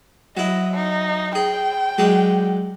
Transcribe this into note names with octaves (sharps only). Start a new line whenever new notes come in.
F#3 E4 D#5
D#4
G#4 G5
F#3 G#3 D4